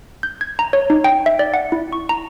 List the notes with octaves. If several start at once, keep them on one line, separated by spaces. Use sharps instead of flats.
G6
G#6
A#5
C#5
D#4
G5
E5
D5
F#5
E4
C#6
A#5